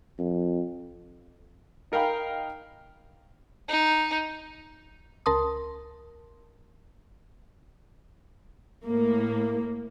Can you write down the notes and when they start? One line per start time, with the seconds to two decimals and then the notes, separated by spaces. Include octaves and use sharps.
0.19 F2
1.92 D#4 A#4 F5 G5 B5
3.68 D#4
5.26 C#2 A#4 A5 C6 D#6
8.85 A2 A#3